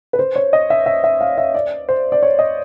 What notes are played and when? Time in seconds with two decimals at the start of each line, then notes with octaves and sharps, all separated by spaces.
0.13 B4
0.19 C5
0.36 C#5
0.53 D#5
0.70 E5
0.86 E5
1.04 E5
1.21 F5
1.38 E5
1.54 D5
1.89 C5
2.12 D5
2.23 C#5
2.39 D#5